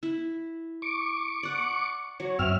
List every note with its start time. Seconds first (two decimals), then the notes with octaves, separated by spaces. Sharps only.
0.03 E4
0.82 C#6 D6
1.43 D5 F#5
2.20 F#3 C#5
2.39 F#2 C4 E5 F6